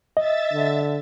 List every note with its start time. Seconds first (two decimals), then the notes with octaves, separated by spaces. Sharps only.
0.17 D#5 E5 A6
0.53 D3